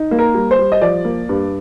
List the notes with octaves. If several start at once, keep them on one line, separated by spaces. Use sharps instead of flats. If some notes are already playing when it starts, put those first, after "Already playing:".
Already playing: D#4
A#3
A#4
G3
C5
G3
D#5
F3 D5
A#3
G2